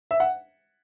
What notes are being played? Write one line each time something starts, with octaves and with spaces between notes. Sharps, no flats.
E5
F#5